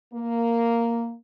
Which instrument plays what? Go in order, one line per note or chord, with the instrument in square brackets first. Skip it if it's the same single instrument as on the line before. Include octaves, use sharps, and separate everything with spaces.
[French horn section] A#3